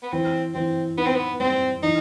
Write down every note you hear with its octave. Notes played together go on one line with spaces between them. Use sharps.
B3
E3 C4
E3 C4
B3 D#4
C4
B3
G3 C4
E3 D#4